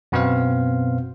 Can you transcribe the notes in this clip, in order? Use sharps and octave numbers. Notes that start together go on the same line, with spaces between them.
F#2 B2 B3 C4 C5 F5